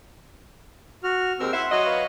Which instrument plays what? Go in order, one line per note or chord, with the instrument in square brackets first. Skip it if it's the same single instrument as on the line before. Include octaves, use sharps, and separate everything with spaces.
[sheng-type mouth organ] F#4 F6
[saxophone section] D#2 G#3 A#4 [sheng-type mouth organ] C4 E6
[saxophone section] E4 C5 E5 [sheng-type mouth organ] F#5 C6
[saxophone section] F#3 F#4 D#5
[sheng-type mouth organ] B4 F5